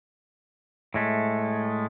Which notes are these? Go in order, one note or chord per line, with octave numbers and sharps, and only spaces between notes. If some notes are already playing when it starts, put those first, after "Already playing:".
A2 G#3 A3